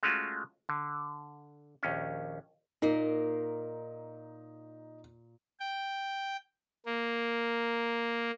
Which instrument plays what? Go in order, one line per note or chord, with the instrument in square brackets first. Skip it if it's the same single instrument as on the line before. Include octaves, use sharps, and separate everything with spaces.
[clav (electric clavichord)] G#3 A3 C#4 F4 F#4
D3
A#1 D#2 C#4
[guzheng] A#2 A#3 [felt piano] D#4
[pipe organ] G5
A#3